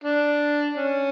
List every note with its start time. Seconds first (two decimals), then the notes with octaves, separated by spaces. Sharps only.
0.04 D4
0.77 C#4